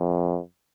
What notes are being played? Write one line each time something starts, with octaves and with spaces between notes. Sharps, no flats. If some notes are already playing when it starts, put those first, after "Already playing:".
Already playing: F2